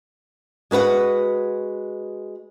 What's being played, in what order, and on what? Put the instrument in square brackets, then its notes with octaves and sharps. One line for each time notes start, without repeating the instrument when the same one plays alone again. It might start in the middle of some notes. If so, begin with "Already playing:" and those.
[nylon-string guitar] G#3 F#4 B4 F#5